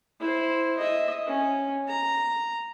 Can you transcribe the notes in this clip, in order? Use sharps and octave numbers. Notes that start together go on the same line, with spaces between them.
E4 C5
D#5 E5
C#4
A#5